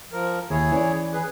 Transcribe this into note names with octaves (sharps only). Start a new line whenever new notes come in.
F3 A#4
D#2 E4 G#4 C#5
E3 C#4 D5
G#4 B4